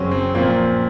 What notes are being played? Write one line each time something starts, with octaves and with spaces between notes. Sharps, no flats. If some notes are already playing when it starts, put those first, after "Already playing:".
Already playing: F#2 C#3 F#3 C4 C#4
C4
A#2 F3 A#3 C4